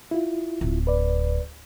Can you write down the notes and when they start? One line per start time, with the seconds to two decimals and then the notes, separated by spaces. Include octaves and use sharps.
0.11 E4 F4
0.61 D1
0.87 B4 D5